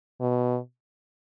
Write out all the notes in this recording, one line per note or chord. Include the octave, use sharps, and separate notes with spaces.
B2